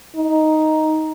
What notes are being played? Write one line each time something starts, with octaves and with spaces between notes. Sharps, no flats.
D#4